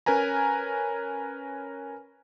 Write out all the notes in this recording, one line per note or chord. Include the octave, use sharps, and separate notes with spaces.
C#4 A#4 B4 G#5 A#5